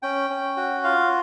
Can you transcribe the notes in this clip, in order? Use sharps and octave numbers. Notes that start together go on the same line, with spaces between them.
C#4 G5
C#4
F#4
F4 F5